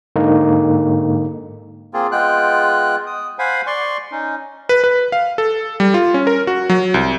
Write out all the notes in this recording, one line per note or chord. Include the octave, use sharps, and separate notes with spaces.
G#2 D3 A#3 D#4
A#3 C4 F4 G#4
G#3 B3 F4 G5 F#6
D#6
C5 F5 F#5 G#5 B5
D5 C6 C#6
C#4 D#4
B4
B4
F5
A4
G3
F4
C#4
A#4
F#4
F#3
C2